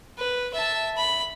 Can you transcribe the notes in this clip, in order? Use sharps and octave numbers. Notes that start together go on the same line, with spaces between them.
B4
E5 A5
B5